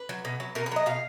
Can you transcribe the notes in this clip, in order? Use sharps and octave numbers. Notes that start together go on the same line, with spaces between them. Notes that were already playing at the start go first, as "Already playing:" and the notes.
Already playing: B4
F#3
B2
F#3
B2 A#4
B4
F#3 D#5
B2 F5